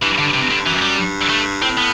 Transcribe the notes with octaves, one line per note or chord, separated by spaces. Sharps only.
G2 E3
D3
C3
D3
F#2 E3
G3
G2
A3
A2 C4
B3